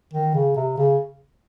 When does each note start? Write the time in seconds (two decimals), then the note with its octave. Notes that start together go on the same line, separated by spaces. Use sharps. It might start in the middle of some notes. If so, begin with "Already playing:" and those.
0.13 D#3
0.34 C#3
0.56 C3
0.77 C#3